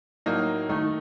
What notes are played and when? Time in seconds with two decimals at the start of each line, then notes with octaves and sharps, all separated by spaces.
0.26 A2 F#3 A#3 D#4
0.69 D#3 A3 D#4